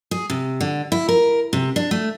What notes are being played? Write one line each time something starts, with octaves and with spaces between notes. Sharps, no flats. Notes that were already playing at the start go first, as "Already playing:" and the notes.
G#4
C3
D3
E4
A#4
C3
D4
A3